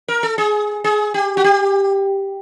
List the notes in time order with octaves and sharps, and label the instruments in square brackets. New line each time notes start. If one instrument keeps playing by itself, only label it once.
[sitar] A#4
A4
G#4
G#4
G4
F#4
G4